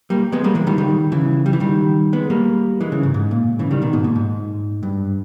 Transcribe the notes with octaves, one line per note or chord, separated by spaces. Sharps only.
G3 A#3
G#3 B3
G3 A#3
E3 G#3
D#3 G3
D#3 G3
C#3 E3
G3
E3
D#3 G3
G#3 B3
G3 A#3
E3 G#3
C#3 E3
G#2
G#2
A#2
C#3 E3
D#3 G3
B2 D#3
G#2 B2
A#2
G#2
G2